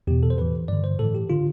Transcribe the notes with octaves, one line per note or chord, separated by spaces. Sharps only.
E2 B2 G4
A4
C5
A2 E3 B4
G2 D3 D5
C5
A2 E3 A4
G4
D3 F4